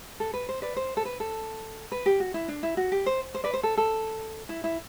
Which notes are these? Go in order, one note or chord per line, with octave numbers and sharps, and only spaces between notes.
A4
B4
C5
B4 D5
C5
A4
B4
A4
B4
G4
F#4
E4
D4
E4
F#4
G4
C5
C5
B4 D5
C5
A4
A4
E4
E4